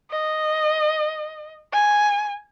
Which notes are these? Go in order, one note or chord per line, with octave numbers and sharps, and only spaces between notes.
D#5
G#5